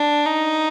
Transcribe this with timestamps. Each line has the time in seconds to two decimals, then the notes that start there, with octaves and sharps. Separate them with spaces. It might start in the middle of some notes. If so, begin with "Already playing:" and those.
Already playing: D4
0.26 D#4